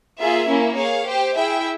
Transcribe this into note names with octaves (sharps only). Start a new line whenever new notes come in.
A#3 F4 G#4 E5
A#3 C#4 E4
G#4 C#5 F5
G4 C5 G5
E4 G#4 E5 G5